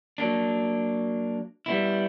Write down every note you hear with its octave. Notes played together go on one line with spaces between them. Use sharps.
F#3 A#3 D4
G3 B3 E4